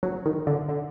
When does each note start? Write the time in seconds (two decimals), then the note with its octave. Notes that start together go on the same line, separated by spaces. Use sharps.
0.03 F#3
0.25 D#3
0.47 D3
0.69 D3